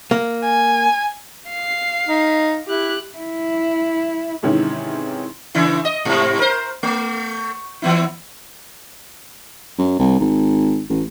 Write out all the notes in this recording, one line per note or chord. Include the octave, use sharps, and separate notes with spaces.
A#3
G#5
F5 C7
D#4
E4 G4 F#6
E4
G#2 C3 D#3 E3 C#4 E4
C#3 E3 E4
D#5
G#2 C3
A#4 C5
A3
E3 B3 E4
F#2
C2
G#1
A1